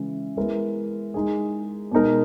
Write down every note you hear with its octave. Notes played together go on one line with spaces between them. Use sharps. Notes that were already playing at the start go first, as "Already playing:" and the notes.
Already playing: C#3 E3 G#3 C#4 E4
G#3 B3 E4 A#4
G#3 D#4 G#4
B2 G#3 D#4 A#4